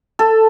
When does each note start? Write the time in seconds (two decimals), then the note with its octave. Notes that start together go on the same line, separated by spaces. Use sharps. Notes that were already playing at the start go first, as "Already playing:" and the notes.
0.19 A4